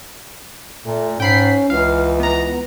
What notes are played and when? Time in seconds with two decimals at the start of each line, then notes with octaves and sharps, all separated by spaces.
0.85 A#2 A3
1.20 G#2 C#4 G5 B5 C7
1.70 C#2 E3 F5
2.20 B3 A#5